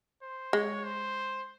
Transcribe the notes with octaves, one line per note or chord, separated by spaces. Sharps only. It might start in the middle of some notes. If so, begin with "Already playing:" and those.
C5
G#3 C#5
C5